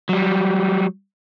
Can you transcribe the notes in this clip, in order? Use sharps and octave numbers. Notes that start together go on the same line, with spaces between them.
F#3 G3